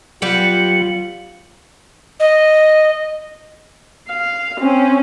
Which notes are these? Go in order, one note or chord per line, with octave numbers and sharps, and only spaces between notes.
F#3 G3 B3 F4
D#5
F5
C4 C#4